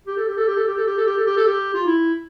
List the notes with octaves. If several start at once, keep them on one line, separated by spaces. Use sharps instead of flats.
G4
A4
G4
A4
G4
A4
G4
A4
G4
A4
G4
A4
G4
A4
G4
F4
E4